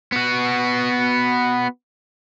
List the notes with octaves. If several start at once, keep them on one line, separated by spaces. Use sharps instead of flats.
B3 F#4